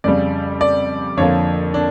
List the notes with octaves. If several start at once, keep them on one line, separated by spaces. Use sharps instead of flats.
F2 C#3 G3 D5
D5
F2 D3 F3 A#3 C#5
D4